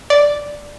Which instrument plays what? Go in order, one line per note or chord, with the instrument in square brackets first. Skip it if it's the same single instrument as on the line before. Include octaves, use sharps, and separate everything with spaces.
[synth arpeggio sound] D5